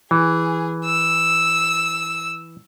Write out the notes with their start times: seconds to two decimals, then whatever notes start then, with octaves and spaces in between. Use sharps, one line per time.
0.11 E3 G#4
0.85 E6